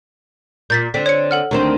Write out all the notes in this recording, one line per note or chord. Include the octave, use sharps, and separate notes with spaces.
A#2 G6 A6 B6
D3 C4 B6
C#5 C#7
A4 F#5 F6
D2 D#3 C4